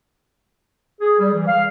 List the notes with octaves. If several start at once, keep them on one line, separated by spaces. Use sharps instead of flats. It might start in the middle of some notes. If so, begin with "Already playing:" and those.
G#4
G3
E3
F5